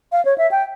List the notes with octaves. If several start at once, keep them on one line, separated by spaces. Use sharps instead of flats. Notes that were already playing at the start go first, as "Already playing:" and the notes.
F5
C#5
E5
G5